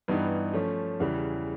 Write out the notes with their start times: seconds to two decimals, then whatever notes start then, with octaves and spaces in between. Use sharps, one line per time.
0.08 G2 E3 G3 B3 D#4
0.53 F3 A3 C#4
1.00 E2 C#3 E3 G3